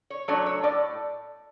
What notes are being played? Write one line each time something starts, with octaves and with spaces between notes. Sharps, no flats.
C#5
F#3 A3 D4 C#5
C#5
A2 D5